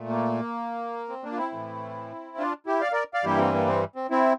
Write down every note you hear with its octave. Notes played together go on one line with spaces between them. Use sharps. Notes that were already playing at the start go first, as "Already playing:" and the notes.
Already playing: A#2 A3
A#3
C4
A#3 D4
F4
C4 E4
A2 E3 A3
D4 F4
E4 G4
D5 F5
A#4 D5
D5 F5
G2 E3 G3 A#3 E4 G4
C4
A#3
C4
C4
C4 E4